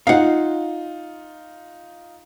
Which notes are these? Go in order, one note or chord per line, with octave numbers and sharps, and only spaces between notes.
D#4 F4 F5 F#5